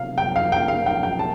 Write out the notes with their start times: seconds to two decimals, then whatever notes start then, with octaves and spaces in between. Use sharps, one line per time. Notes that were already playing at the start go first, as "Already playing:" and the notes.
Already playing: C3 F5
0.18 G5
0.36 F5
0.52 G5
0.68 F5
0.86 G5
1.03 G5
1.19 A5